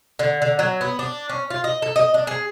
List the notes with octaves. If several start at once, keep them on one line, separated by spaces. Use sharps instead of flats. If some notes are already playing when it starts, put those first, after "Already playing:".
D3
D3
F#3
B3
D4
C#4
F4
D#5
A4
D#5
D4
G#4